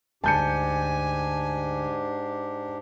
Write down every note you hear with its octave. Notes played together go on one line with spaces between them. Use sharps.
D2 G#2 D4 G4 G#5 A5 G6 C#7